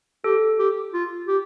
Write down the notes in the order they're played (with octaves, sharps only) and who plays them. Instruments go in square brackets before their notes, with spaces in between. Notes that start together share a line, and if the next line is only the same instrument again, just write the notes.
[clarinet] G4 [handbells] A4
[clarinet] G4
F4
G4